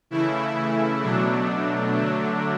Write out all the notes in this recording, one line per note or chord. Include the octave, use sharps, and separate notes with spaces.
C#3 E3 A3 E4
B2 F#3 A3 D4
D3 F#3 A3